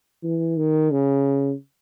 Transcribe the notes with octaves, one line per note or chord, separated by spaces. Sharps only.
E3
D#3
C#3